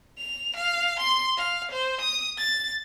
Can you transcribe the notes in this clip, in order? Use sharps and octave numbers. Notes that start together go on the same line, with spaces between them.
F7
F5
C6
F5
C5
D#6
A6